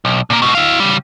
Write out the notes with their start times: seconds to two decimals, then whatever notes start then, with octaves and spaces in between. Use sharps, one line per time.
0.05 B1
0.30 A#2 A#3
0.42 G#2 B2
0.55 E4 F5
0.80 C#3 G3